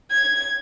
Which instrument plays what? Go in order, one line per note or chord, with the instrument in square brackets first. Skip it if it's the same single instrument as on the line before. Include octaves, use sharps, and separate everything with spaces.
[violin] G#6